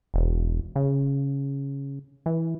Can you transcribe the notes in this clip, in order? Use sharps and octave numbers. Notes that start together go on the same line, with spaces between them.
E1
C#3
E3